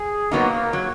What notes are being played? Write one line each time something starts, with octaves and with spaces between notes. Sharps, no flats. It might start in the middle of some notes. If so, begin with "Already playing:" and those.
Already playing: G#4
F#3 A#3 B3 D#4
F#3